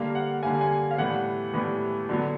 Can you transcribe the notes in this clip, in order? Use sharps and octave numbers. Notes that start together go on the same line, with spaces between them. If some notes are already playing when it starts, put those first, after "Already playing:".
Already playing: D3 G3 A#3 F5
F#5
D3 G3 A#3 G#5
G#5
F5
A2 E3 G3 B3 F#5
A2 E3 G3 B3
D3 F#3 B3